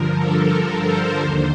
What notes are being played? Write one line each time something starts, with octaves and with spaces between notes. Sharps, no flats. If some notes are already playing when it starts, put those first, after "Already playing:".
Already playing: G2 D3 F3 A#4
A4
A#4
C5
D#2 D3 C5